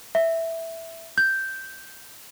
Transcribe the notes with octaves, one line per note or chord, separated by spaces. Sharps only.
E5
G6